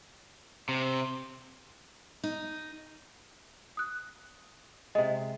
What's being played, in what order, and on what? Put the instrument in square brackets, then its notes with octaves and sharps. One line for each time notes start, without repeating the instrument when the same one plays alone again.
[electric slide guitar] C3
[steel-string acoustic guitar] D#4
[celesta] D#6 F#6
[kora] C3 G#3 [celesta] D#5